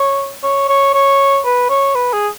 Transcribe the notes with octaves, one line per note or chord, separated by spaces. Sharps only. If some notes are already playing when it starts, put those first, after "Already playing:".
Already playing: C#5
C#5
C#5
C#5
B4
C#5
B4
G#4